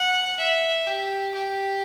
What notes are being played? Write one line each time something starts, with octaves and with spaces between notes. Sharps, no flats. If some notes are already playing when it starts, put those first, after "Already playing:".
Already playing: F#5
E5
G4
G4